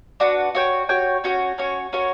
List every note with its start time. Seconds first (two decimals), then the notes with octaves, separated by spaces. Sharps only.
0.20 D4 F#4 B4
0.55 F#4 C#5 G5
0.89 F#4 C#5 G5
1.24 C#4 F#4 C#5
1.58 C#4 F#4 C#5
1.93 C#4 F#4 A#4 C#5